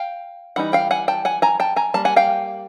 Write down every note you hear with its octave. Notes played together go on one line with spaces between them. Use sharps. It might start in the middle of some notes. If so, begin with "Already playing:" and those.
Already playing: F5 G5
E3 G3 D#4 F#5
F5 G5
F#5 G#5
G5 A5
F#5 G#5
G#5 A#5
G5 A5
G#5 A#5
G3 A#3 A5
F#5 G#5
F5 G5